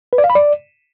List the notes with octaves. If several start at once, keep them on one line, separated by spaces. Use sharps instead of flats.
B4
D5
F5
B5
D5